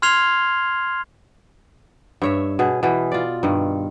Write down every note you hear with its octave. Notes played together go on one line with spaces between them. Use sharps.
C6 F6 G#6 C7 F7 G7
G2 C#5 E5
B2 G#4
B2 E3
F4 D5
G2 D#3